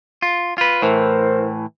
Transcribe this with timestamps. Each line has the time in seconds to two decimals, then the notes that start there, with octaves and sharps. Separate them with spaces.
0.22 F4
0.58 F4 B4
0.82 A2 E3 A#4 C5